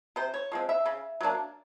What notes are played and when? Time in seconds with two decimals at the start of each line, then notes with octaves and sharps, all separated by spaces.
0.16 C3 C5
0.34 C#5
0.52 F3 G#3 C4
0.69 E5
0.86 C#3
1.21 F#3 A#3 D4